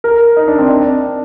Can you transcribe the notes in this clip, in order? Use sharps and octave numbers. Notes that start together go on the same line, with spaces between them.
A#4
D#4
D4
C4
D4